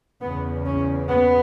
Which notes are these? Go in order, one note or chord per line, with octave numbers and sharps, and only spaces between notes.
E2 C#3 B3
C#4
B3